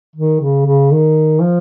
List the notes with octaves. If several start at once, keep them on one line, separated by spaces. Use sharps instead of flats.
D#3
C#3
C#3
D#3
F3